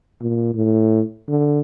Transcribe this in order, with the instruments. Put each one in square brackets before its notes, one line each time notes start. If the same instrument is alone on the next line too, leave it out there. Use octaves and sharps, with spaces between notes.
[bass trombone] A#2
A2
D3